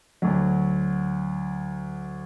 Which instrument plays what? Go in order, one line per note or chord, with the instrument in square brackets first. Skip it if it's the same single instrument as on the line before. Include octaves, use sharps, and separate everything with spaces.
[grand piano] D2 F#3